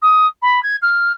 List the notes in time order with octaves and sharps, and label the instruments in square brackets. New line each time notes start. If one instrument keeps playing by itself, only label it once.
[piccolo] D#6
B5
G#6
F6